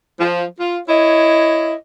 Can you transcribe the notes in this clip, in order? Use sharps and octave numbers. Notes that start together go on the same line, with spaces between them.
F3
F4
E4 C#5 D#5